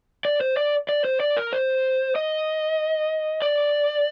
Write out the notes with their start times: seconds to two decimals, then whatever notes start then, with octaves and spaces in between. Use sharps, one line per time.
0.25 D5
0.41 C5
0.57 D5
0.89 D5
1.05 C5
1.20 D5
1.37 A#4
1.53 C5
2.16 D#5
3.42 D5